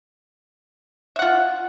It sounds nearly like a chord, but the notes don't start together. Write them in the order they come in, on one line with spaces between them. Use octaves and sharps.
E5 F#5 F4